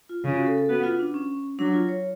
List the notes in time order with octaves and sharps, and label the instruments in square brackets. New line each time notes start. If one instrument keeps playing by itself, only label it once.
[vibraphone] F4
[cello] C#3 [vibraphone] F4
[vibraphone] F#4
A4
A4
[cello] B3 [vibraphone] F#4
[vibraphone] F4
D4
C#4
[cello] F#3 [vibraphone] D4
[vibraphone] F4
C#5